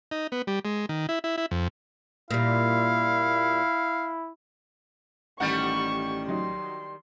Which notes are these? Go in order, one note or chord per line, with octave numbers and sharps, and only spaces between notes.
D#4
B3
G3
G#3
D#3
E4
E4
E4
F2
A#2 G3 E4 F5
A1 D#3 G3 F#5 C#6 G6 A6
F#3 D#4 C6